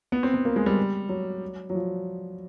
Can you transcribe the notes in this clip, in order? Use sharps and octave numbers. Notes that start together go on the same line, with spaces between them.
B3
C4
B3
A#3
G#3
G3
F#3
F#3
F3